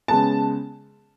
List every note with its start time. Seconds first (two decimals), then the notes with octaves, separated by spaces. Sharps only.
0.08 C#3 G#3 B3 A5